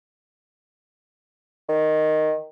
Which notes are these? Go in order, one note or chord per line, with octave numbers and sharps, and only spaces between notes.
D#3